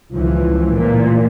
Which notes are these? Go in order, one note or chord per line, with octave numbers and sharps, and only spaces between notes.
C#2 E3 F3
A#2